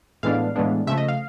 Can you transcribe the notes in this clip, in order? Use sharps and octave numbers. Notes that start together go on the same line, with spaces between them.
A2 E3 G#3 B3 D4 F5
A2 E3 G#3 B3 D4
C#3 F3 A3 E5
D#5
F5